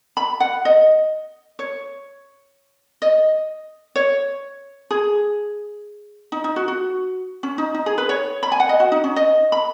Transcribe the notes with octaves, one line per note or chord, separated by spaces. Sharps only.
B5
F#5
D#5
C#5
D#5
C#5
G#4
D#4
D#4
F#4
F#4
C#4
D#4
D#4
G#4
B4
C#5
B5
G#5
F#5
D#5
F#4
D#4
C#4
D#5
B5